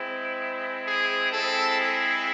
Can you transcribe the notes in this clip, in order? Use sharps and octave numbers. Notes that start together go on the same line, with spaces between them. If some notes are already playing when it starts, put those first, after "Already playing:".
Already playing: G#3 C4 E4
G#4
G#3 C4 E4 A4
G#4